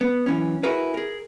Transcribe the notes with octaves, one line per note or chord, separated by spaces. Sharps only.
B3
F#2 E3 C#4
E4 F#4 G#4 A#4 B4
G#4 A#4